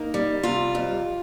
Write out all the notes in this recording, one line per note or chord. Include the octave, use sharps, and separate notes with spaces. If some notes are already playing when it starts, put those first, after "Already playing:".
Already playing: A#3 D#4
G3
C3 F4
F2